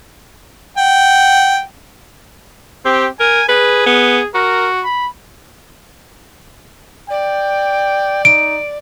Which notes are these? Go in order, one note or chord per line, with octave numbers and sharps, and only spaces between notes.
F#5 G5
C4 G4
A#4 G#5
G#4 B4
B3
F#4 A#4
B5
D5 G5
D#4 D7